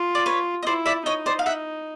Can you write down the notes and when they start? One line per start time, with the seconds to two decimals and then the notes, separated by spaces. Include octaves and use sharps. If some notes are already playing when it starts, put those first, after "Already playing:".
Already playing: F4
0.15 D5
0.26 B4 C#5
0.63 D#5
0.66 E4 C5 D5
0.86 D5 E5
1.06 D#4 C#5 D#5
1.26 C5 D5
1.39 F5
1.46 E5 F#5